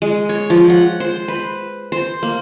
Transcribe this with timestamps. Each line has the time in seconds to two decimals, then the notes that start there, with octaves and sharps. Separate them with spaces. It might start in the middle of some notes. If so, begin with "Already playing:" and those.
0.02 G#3
0.29 C#5
0.50 F3
0.70 F#5
1.00 C5
1.28 B4
1.92 C5
2.23 A#3